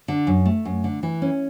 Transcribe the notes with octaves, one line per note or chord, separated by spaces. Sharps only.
D3
F#2
A3
F#2
D3
E3
C#4